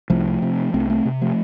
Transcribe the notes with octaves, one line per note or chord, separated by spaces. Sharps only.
C2 F3 A3
C3
C2 A3 C4
A3 C4
C3
F3 A3